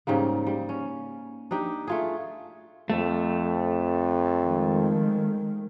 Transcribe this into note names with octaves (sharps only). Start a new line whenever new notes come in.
G#2 C#3 G3 A#3
G3
C#4
D4 D#4 G4
A3 F4 G#4
F2 A3
D#3 G#3